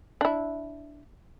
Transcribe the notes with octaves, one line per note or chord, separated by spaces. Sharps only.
D4 E4